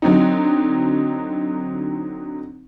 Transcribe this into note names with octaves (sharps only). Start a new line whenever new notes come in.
D3 F#3 C4 D#4